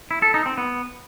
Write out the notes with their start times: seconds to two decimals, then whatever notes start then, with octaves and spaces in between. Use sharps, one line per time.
0.11 E4
0.22 A4
0.34 D#4
0.46 C4
0.58 B3